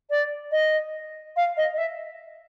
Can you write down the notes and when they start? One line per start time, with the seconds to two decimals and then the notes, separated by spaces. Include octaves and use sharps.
0.10 D5
0.51 D#5
1.36 F5
1.57 D#5
1.73 D#5
1.78 E5